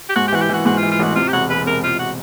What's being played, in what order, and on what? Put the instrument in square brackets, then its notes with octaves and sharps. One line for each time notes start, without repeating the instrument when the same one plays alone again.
[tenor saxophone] G4
[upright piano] G#2 [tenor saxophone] F#4
[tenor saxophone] G4
[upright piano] E3 [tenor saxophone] F#4
[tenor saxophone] G4
[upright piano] E3 [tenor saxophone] F#4
[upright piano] G#2 [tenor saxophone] F#4
[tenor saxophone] F4
[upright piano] E3
[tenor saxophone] F4
[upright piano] A1 [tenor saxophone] F#4
[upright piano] C3 [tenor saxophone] F4
[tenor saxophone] G4
[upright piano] E1 [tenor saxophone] F#4
[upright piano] E1 [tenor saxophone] B4
[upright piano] C3 [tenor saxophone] A#4
[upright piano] E1 [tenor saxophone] F4
[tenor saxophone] F#4